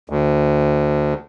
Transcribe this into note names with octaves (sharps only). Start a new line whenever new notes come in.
D2